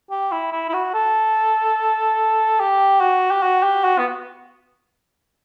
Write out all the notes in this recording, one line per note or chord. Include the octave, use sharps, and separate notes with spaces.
G4
E4
E4
E4
F#4
A4
G4
F#4
G4
F#4
G4
F#4
B3